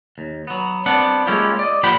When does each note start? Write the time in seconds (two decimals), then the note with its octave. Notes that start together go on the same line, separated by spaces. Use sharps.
0.18 D#2
0.47 F#3 B3
0.86 G3 B3 C4 D4 F#5
1.26 G#3 A#3 C#4 E4 F4 G4
1.59 D5 D#5
1.83 A#2 F3 G4 F#5 G5 B5